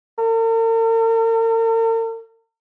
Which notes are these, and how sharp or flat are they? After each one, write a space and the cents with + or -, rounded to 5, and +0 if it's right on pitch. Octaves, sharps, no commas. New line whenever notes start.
A#4 -45